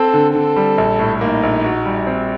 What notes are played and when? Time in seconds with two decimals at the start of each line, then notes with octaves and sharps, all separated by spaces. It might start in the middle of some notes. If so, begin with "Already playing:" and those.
Already playing: C4 A4
0.14 D3
0.35 D3 A4
0.56 G3
0.78 A#1
0.99 A2
1.21 A#3 D#4
1.43 A#1
1.64 F#4
1.86 G3
2.07 C4